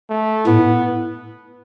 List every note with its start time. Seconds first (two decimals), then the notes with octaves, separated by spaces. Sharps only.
0.10 A3
0.47 A2 B3